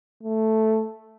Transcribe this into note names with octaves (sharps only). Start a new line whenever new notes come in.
A3